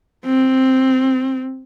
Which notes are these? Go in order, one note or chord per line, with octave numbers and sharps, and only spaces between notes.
C4